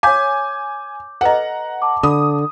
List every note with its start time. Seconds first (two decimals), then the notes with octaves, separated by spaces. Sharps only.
0.03 C#5 F5 G#5 D6 G6
1.21 A4 B4 D#5 F#5 A#5
1.82 A5 D6
2.03 D3 B5 D#6